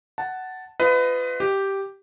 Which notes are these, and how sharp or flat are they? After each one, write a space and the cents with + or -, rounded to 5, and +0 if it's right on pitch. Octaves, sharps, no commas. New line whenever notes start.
F#5 +10 A5 +0
F4 +0 B4 +30 D#5 +0
G4 -5 G5 +0